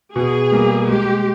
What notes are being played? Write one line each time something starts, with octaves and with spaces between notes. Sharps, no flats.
B2 G#4
G3 A#3
G#3 G4